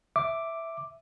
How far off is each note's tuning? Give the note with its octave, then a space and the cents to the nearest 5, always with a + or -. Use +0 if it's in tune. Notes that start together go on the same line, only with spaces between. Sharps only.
E5 +0 D6 +0